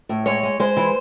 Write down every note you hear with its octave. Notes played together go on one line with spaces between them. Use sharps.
A2
G#3 C#5
G#3
G#3 C5
E3